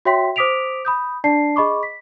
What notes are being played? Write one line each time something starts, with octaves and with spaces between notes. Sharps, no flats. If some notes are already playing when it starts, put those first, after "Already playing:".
F#4 C#5 E5 G5 C6 B6
C5 D6 D#6 B6 D7 F7
B5 D#6 G6
D4 D5 A5 C7
G#4 D#5 B5 C#6 D6
B6